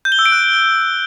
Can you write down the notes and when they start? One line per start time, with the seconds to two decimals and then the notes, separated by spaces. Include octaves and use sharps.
0.05 G6
0.12 G7
0.19 E6
0.26 D7
0.32 F#6